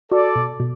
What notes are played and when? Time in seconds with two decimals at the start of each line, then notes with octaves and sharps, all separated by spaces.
0.12 F#4 A4 D5
0.36 B2
0.60 B2